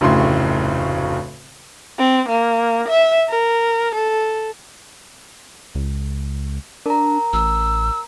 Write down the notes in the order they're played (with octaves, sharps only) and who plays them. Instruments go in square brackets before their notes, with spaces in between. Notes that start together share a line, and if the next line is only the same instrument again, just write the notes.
[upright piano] F1 D2 A2 C#3 C6
[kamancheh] C4
A#3
E5
A#4
A4
[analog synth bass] C#2
[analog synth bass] D4 [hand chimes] A#4 A#5
[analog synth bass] A1 [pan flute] E6